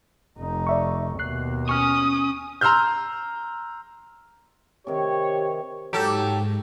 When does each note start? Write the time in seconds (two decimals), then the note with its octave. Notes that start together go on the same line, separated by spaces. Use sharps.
0.38 F1 D#4
0.67 D5 E5 C#6
1.19 D#2 B2 F#6 C7
1.69 C#4 G#5 C#6 D#6 F6
2.61 A#5 C6 E6 F6 G6
4.87 C3 D#3 G4 C#5
5.93 G#2 F#3 G4 A4